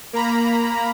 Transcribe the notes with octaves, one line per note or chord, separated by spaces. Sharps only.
A#3 A#5 B5